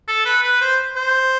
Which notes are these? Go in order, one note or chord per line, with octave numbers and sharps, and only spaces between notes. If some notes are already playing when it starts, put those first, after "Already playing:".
A4
B4
B4
C5
C5